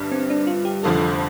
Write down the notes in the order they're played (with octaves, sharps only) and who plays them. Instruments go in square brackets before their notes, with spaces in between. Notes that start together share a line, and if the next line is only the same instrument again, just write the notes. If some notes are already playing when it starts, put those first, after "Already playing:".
Already playing: [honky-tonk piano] G1 G2 G3
[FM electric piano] C4
D4
F4
G4
[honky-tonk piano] F1 F2 D3 F3 [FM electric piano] A4
[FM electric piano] C5